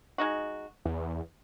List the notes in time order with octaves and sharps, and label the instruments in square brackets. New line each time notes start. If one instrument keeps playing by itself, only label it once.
[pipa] G#3 D#4 F#4
[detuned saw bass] E2